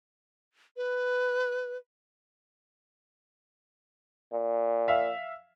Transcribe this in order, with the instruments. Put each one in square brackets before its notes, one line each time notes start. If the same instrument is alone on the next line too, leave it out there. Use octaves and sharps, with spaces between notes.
[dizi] B4
[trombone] A#2
[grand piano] E5 F5